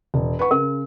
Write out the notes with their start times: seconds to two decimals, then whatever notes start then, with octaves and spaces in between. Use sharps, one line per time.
0.14 E1
0.39 B4 F#5 C#6
0.51 C#3 A#4